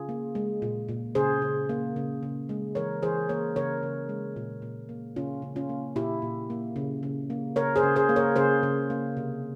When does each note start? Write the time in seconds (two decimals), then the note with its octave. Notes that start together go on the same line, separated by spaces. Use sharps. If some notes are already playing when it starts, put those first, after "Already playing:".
Already playing: C#3 F4 G#4
0.09 A#3
0.35 G#3
0.62 A#2
0.88 A#2
1.15 C#3 G#4 C5
1.42 C#3
1.69 A#3
1.96 C#3
2.23 C#3
2.49 G#3
2.75 E3 A#4 C#5
3.03 E3 G#4 C5
3.29 A#3 A#4 C#5
3.56 C#3 A#4 C#5
3.83 C#3
4.09 G#3
4.36 A#2
4.62 A#2
4.89 A#3
5.16 C#3 C#4 F4
5.42 C#3
5.56 C#4 F4
5.69 A#3
5.96 A#2 E4 G4
6.22 A#2
6.50 A#3
6.76 C#3
7.03 C#3
7.30 A#3
7.56 C#3 A#4 C#5
7.76 G#4 C5
7.83 C#3
7.96 G#4 C5
8.09 A#3
8.16 A#4 C#5
8.36 C#3 G#4 C5
8.63 C#3
8.90 A#3
9.17 C3